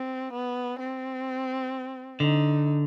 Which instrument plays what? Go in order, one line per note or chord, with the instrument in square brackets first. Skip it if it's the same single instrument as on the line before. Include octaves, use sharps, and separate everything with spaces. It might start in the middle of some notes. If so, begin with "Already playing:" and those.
Already playing: [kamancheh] C4
B3
C4
[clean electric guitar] D3 [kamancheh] D#4